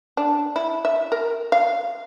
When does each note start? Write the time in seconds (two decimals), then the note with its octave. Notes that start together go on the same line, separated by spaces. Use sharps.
0.17 D4
0.56 E4
0.85 E5
1.12 A#4
1.52 F5